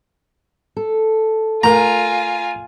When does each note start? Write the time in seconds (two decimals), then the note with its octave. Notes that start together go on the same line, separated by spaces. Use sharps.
0.76 A4
1.63 A3 F4 A#4 G#5 A#5